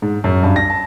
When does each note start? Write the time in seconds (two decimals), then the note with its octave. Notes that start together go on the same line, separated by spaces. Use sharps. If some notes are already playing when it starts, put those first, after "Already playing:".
0.02 G#2
0.24 F#2
0.43 G2
0.56 A#6
0.70 A5